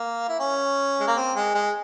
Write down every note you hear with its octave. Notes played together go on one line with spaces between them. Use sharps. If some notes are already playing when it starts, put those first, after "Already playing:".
Already playing: A#3
E4
C#4
G#3
A#3
C4
G#3
G#3